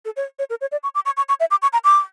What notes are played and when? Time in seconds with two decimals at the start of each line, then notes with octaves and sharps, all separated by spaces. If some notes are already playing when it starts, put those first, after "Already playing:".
0.05 A4
0.16 C#5
0.39 C#5
0.50 A#4
0.61 C#5
0.72 D5
0.83 C#6
0.95 D6
1.06 C#6
1.17 C#6
1.29 C#6
1.40 E5
1.51 D6
1.62 C#6
1.73 A#5
1.84 D6